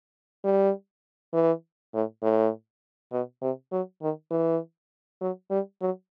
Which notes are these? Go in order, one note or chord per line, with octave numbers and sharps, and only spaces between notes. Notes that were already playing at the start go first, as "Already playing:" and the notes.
G3
E3
A2
A2
B2
C3
F#3
D#3
E3
F#3
G3
F#3